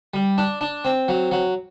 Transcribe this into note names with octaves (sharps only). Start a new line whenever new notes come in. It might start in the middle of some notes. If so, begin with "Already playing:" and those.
G3
D4
D4
C4
F#3
F#3